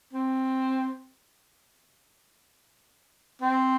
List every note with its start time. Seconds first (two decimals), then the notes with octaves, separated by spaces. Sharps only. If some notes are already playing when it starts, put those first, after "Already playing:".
0.13 C4
3.42 C4